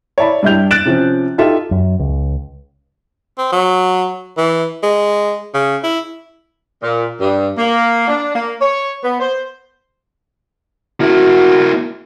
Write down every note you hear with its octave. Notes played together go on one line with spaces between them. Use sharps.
C#5 D5 E5 A5 B5
G2 D4 E4 G4 G6 F7
F#6 A6 D7 E7
C3 F3 C#4
D#4 F4 G4 A4 E5
F#2
C#2
C4
F#3
E3
G#3
C#3
E4
A#2
G2
A#3
D4
A#3
C#5
B3
C5
A#3 E4 F#4